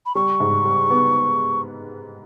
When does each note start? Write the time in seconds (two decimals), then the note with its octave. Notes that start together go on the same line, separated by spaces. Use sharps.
0.06 B5
0.15 G3 C#6
0.40 G#2
0.65 G3
0.90 B3